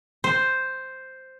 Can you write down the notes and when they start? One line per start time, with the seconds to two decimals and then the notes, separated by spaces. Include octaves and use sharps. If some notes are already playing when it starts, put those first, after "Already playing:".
0.24 C5